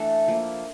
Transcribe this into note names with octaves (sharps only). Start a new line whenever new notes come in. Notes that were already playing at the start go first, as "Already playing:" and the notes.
Already playing: E3 A3 D4 A4
F3 A#3 E4